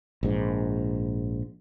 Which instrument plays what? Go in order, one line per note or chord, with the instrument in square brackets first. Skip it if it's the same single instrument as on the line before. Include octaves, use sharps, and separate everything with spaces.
[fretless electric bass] A#1 G#2